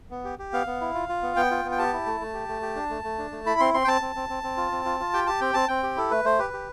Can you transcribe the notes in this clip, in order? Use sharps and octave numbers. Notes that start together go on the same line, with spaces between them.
B3
G4
G4
B3 F5
B3
E4
F4
F4
B3
B3 G5
F4
B3
G5
G4 A5
E4
A3
A3
G4
A3
G4
D4
A3
A3
D4
A3
E4 B5
C4 C6
C4 C6
G5
C4 A5
C4
C4
C4
C4
F4
C4
F4
F4
G4 G5
G4 A5
C4 G5
C4 A5
C4 G5
G4
E4 A4
A3 B4
A3 C5
G4 B4
G4